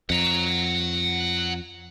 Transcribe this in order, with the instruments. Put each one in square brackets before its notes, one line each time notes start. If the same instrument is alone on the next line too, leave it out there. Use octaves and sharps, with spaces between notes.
[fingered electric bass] F2 [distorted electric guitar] F#5 A#5